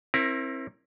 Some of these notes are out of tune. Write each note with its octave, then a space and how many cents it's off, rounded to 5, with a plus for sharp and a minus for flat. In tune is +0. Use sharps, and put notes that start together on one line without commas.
C4 +35 E4 +0 A#4 +15